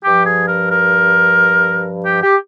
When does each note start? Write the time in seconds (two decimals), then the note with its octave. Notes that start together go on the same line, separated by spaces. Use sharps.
0.03 G2 F3 G4
0.26 G#4
0.48 A#4
0.71 A#4
2.05 G4
2.22 G4